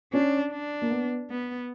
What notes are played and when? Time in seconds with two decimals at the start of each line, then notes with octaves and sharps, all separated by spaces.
0.13 C#4 D4
0.52 D4
0.82 A#3
0.90 B3
1.30 B3